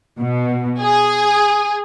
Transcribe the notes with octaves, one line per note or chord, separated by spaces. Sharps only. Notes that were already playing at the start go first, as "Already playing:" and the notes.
B2
G#4